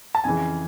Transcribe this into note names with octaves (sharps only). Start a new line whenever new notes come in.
A5
F2 C#3 E3 G#5